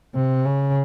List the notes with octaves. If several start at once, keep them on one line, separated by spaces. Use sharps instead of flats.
C3
C#3